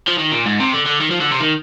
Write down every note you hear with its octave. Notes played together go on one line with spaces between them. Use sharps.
F3
D#3
A#2
G#2
C3
D3
D3
D#3
F3
D3
C3
D#3